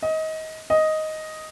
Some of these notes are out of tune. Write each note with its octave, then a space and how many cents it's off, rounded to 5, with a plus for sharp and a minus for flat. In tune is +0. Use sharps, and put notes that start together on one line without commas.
D#5 +25
D#5 +5